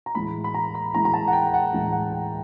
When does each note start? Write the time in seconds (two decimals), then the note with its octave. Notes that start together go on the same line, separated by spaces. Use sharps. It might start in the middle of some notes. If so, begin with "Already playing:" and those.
0.06 A#5
0.15 A2 E3 G#3 B5
0.44 B5
0.54 A#5
0.75 B5
0.93 A2 E3 G#3 A#5
1.05 A#5
1.14 A5
1.28 F#5
1.33 G5
1.54 F#5
1.73 A2 E3 G#3
1.92 F#5
2.12 G5